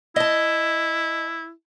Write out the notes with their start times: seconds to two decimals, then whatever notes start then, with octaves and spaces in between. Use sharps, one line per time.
0.16 E4 D#5 A5